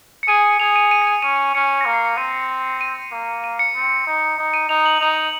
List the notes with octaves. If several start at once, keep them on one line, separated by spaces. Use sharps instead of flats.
C#7
G#4 D#7
G#4 F7
D#7
C#7
D#7
C#7
D#7
C#4 D#7
C#4 C#7
A#3 A#6
C7
C#7
C4 D#7
D#7
A#3
D#7
C#7
C4
D#4
D#4
D#7
D#4 F7
F#7
D#4 F7